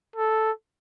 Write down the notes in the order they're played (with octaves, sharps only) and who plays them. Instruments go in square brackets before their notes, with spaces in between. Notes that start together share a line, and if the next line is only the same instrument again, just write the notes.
[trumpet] A4